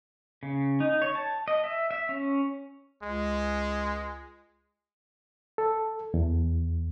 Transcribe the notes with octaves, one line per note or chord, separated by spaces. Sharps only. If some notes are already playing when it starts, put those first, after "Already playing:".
C#3
D#4
C#5
A5
D#5
E5
E5
C#4
C#2 G#3
A4
E2